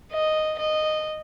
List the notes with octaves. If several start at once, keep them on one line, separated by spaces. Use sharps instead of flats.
D#5
D#5